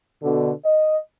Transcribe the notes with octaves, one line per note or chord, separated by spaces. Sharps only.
B2 D3
D#5